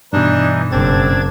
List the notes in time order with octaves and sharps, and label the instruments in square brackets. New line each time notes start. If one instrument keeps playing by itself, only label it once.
[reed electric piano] G2 B2 [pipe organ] E3 D#4 [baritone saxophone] D4
[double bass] F#1 [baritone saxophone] C4 [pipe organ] D4 G#6 A6